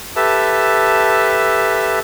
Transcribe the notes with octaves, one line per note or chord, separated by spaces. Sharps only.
G4 A4 B4 E5 A5